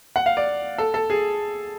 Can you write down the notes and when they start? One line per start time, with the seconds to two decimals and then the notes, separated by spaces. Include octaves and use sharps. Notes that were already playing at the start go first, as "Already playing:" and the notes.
0.16 F#5
0.26 F5
0.37 D5
0.78 A4
0.94 A4
1.10 G#4